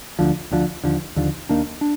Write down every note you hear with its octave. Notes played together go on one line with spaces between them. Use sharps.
D2 D3 F3
D2 D3 F3
D#2 D3 F3
D#2 D3 F3
D#2 D#3 A#3 D4
D4